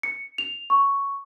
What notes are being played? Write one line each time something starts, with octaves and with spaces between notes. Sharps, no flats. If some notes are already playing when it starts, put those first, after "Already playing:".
C#7
F7
C#6